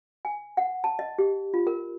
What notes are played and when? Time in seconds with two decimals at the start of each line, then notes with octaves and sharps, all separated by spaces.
0.25 G#5
0.57 F#5
0.84 A5
0.99 D#5
1.18 G4
1.54 F4
1.67 A#4